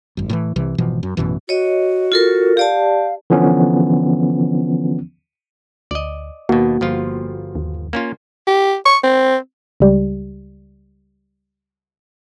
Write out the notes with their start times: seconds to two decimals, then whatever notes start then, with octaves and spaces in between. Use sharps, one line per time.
0.17 G#1 F#2
0.29 A2 D3 E3
0.56 C2 C3 E3
0.78 G#1 B2 E3 F3
1.03 F#2
1.17 A1 F#2 B2 E3
1.49 F#4 C#5 D#5
2.12 F4 A4 A#4
2.57 G4 D5 F5 A5
3.30 D3 E3 F3 B3 C#4
5.91 D2 D5 D#5
6.49 D#2 B2 A#3 F#4
6.81 G1 F3 F4
7.55 D#2
7.93 A#3 C#4 F4
8.47 G4
8.86 C#6
9.04 C4
9.80 C#2 G3